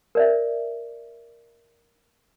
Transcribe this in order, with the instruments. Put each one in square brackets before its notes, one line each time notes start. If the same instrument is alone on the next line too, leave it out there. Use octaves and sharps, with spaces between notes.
[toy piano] A#4 D5 E5